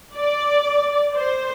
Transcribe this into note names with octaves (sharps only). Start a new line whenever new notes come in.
D5
C5